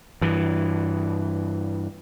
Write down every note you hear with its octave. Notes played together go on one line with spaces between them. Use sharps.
G2 E3